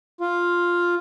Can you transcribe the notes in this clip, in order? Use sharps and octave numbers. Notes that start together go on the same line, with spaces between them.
F4